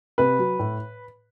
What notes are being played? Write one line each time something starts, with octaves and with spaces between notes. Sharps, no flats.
C3 B4
F#3
A2